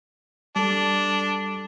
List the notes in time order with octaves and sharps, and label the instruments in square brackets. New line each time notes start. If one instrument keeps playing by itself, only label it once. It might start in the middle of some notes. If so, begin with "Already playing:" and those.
[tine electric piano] G3 A4 [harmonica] D4